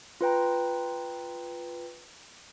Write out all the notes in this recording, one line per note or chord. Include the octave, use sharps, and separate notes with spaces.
F4 B4 G5 A#5